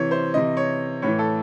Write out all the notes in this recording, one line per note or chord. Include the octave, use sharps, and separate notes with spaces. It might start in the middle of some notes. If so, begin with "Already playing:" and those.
Already playing: C3 E3 C#5
C5
C3 E3 D#5
C#5
A2 E3 C#5
A4